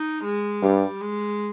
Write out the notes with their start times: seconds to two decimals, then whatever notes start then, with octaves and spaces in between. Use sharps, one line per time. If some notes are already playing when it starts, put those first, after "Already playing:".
Already playing: D#4
0.24 G#3
0.62 G2 G3
1.01 G#3